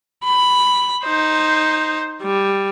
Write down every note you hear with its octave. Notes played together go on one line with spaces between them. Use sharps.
B5
D#4 C5
G3